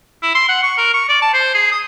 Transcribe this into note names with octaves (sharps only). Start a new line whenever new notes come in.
E4
C6
F#5
C#6
A#4
C#6
D5
A5
C5
G#4
D#6